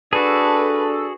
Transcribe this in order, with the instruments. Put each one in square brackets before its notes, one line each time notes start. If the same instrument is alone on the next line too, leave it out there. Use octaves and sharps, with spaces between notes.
[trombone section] D4 [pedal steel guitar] F#4 G#4 [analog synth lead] A4 [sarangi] B4